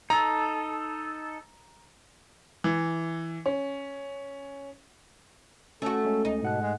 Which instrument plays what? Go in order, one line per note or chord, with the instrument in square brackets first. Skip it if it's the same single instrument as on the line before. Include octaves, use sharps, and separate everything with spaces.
[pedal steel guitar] D#4 A4 [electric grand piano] A#5
[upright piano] E3
C#4
[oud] A3 F#4 [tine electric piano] C#4 [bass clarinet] A4
[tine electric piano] G#3 C#4
[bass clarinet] D2 [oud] D#4
[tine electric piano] G#2 F#5 F#6 [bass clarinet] B2
[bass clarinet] G#3